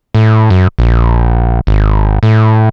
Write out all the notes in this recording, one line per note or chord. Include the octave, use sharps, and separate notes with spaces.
A2
F#2
A#1
G#1
A2